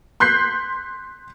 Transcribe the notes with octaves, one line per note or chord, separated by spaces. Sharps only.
C6 F#6 G6 B6 C7